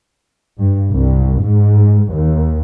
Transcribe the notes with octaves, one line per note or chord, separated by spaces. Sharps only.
G2
C2
G#2
D#2